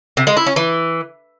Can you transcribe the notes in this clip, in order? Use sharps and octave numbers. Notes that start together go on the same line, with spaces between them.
C3
G#3
E4
C#4
E3